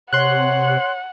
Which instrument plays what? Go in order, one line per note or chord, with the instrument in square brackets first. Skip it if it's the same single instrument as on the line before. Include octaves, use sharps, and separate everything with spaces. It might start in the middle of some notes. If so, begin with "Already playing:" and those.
[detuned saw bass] C3 [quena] C#5 [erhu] F#5 [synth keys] C6 F#6